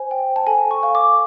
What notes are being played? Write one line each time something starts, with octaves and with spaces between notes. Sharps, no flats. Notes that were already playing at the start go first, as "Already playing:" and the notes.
Already playing: C5 G#5
G5
A5
A4 G#5
C#6
F5
D6